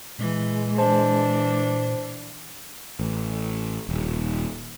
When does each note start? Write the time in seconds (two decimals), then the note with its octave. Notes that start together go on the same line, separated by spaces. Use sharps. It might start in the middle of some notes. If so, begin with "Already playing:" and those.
0.19 A#2 E3 G#3
0.78 E3 D4 C5 A5
3.00 A1
3.89 D#1